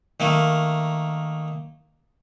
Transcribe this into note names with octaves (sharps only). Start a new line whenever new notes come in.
D#3 A3 A#3